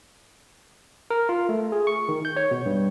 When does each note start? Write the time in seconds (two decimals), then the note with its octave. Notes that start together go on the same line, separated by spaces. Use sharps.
1.10 A#4
1.29 F4
1.49 A3
1.72 G#4
1.87 C#6
2.08 D#3
2.25 G6
2.36 C#5
2.51 B2
2.66 G2